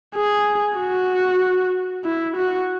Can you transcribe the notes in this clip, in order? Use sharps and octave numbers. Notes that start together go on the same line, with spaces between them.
G#4
F#4
E4
F#4